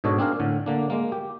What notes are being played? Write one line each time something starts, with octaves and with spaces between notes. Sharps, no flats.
G#2 B2 D4 A4 C#5 D#5
C4 D4 G#4 A#4 F5
A2 D3
D3 A#3 D4
G#3 A#3
G4